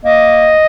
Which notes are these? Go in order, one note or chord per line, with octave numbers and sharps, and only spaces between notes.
A#3 D#5